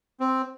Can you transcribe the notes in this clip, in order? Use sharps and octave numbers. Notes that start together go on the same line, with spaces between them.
C4